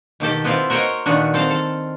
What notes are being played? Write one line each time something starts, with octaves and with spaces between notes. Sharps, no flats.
B2 D#3 G4 A4
B3 C4 E4 F4
F#4 A#4 C5 C#5 D#5
A#2 D#3 B3 D4 F#4
C4 A4 F5
A4